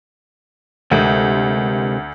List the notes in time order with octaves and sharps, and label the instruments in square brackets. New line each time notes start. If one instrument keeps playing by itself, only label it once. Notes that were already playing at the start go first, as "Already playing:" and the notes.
[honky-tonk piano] D2 [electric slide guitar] C3 G#3 G4